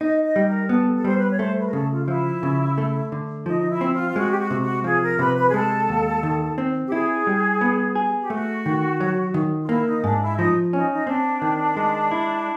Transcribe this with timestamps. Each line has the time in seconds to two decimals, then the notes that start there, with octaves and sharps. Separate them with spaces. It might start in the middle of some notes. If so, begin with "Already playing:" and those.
0.01 D#4 D#5
0.24 D#5
0.36 G3
0.47 A#4
0.69 B3 A4
0.93 A4
1.04 G3 C5
1.16 B4
1.29 C#5
1.39 A3 C5
1.59 B4
1.66 A#4
1.73 C#3 A4
1.91 F4
2.03 F4
2.08 F3 E4
2.43 C#3
2.78 A3
3.12 D3
3.46 F3 D#4
3.58 D#4
3.70 E4
3.81 C4
3.93 F4
4.08 F4
4.16 G#3 F#4
4.30 G4
4.39 F#4
4.51 C3
4.62 F#4
4.84 F3 G#4
5.02 A#4
5.19 C3 B4
5.37 B4
5.48 G#4
5.54 G#3 A4
5.89 D#2
6.23 D#3
6.58 C4
6.87 G4
6.92 E4 G#4
7.27 G3
7.61 B3
7.95 G#4
8.20 G4
8.30 A3 F#4
8.66 D#3
9.00 F#3
9.34 D#3
9.61 F4
9.68 A#3 E4
9.86 D#4
10.04 G#2 D4
10.21 E4
10.38 F3 D#4
10.73 C#4 D#4
10.90 D#4
11.07 C4 D4
11.42 D#3
11.77 G#3
12.11 E4